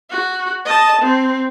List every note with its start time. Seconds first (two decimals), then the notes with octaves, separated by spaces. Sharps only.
0.10 F#4
0.65 D#5 A5
1.01 C4